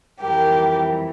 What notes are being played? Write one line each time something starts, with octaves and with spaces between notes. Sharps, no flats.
F2 E3 G3 G4 A#4